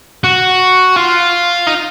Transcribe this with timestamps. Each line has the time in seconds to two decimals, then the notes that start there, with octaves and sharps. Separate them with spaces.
0.24 F#4
0.96 F4
1.67 D#4